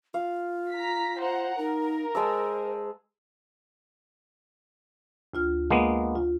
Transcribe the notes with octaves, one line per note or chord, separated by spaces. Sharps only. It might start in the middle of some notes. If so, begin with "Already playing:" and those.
F4 F5
A#5 B6
C5 F#5 A#5
D#4 A#4
G#3 C5 A5 E6
D2 F4 F6
G#3 A#3 B3
F4